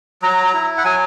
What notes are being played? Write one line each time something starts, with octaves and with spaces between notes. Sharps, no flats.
F#3 A#5
E4
F#5
F#3 G#5